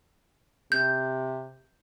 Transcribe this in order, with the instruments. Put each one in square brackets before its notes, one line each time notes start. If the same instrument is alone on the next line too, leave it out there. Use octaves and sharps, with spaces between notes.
[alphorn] C3 [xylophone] G6